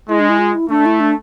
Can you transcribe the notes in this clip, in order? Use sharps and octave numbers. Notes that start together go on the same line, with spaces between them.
G#3 E4
D4
E4
F4
E4
A3 D4
E4
D4